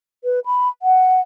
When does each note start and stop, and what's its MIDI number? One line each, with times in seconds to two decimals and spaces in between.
0.24 0.40 71
0.46 0.68 83
0.82 1.20 78